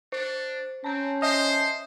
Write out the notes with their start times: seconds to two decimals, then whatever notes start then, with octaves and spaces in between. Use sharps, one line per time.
0.12 D4 C5
0.84 C4 C#4 A5 A#5 G6
1.22 C5 D#5 E5 A5 D#6 C7